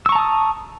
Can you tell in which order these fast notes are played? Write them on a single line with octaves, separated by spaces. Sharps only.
E6 C#6 A#5 A5 D#6